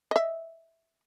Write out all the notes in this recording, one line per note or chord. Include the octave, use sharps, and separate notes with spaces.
D#5 E5